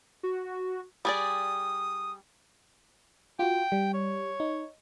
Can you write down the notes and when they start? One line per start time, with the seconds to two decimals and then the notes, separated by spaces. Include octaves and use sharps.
0.23 F#4
1.05 G3 G#4 D5 D#6
3.39 F4 F#4 G5
3.72 G3
3.94 C#5
4.40 D#4